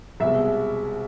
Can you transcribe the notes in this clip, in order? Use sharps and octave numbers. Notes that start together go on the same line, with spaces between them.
C2 B2 G#3 E5